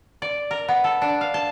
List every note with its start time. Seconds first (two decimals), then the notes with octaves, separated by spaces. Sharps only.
0.22 D5
0.51 A#4
0.68 B3
0.84 A4
1.02 D4
1.21 F5
1.34 A5